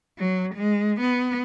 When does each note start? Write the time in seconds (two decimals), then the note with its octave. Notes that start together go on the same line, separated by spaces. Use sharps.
0.18 F#3
0.55 G#3
1.01 B3